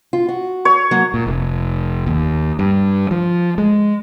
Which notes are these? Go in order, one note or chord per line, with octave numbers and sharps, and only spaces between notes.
F4
F#4
C#5
F#3 A#3
A#2
F1
D#2
G2
F3
G#3